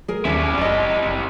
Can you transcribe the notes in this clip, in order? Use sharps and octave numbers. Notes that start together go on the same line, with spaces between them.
G#4 A#4
D#2 G3 C#4 E4
F#1 D5 D#5
F#1